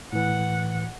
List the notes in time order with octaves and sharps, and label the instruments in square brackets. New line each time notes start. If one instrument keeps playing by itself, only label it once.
[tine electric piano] A2 E3 [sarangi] F#5